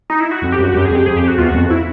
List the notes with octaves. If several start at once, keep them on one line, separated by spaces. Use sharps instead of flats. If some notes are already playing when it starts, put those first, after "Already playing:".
D#4
E4
F#4
F2
G4
F#2 F#4
F#2 G4
G#4
F2 G4
F2 G#4
G4
F#4
E2 F4
F2 F#4
E4